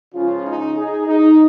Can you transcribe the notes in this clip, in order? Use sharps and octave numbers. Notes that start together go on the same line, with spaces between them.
C#2 C#3 F3 C#4 F4
D#4
D#4 G#4
D#4